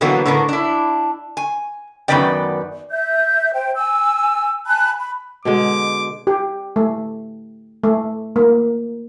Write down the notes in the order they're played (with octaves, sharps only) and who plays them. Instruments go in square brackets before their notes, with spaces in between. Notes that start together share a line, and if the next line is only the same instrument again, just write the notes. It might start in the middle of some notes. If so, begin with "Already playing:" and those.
[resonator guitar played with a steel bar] B2 D3 E3 F#3 A#3 B3
A2 D3 B3 A4 A#4
D4 E4
G#5
F#2 D#3 B3 B4 D5 G5
[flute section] E5 G6
C5 G5
G#5 E6
G#5 A5 B5 F#6
B5
[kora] B2 D3 G#3 [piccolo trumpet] D6
[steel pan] G4
A3
A3
A#3